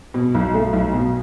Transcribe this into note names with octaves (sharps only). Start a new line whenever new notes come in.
B2
B1
A3
B1
B2